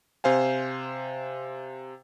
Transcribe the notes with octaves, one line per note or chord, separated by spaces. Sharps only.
C3 C5 F5 G#5